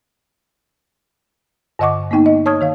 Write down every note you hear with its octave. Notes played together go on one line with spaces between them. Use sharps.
G2 D3 D#5 F#5 C#6 D6
A#3 B3 D#4 G5
D#5
C#5 A5 C#6 D#6 F6 G#6
D#3 C#5 F5